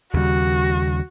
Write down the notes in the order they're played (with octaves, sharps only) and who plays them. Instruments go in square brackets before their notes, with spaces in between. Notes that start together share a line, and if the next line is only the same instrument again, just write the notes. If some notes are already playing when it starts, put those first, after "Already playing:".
[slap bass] D#2 C#3 G3 [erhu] F#4